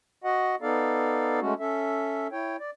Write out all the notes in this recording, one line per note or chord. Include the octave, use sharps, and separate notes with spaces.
F#4 D#5 F#5
B3 D#4 A4 D5 F5
G#3 A3 C#4 F#4
C#4 A4 E5
E4 C#5 G5
D5